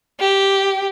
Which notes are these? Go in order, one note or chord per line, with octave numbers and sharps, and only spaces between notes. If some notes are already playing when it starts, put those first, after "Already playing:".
G4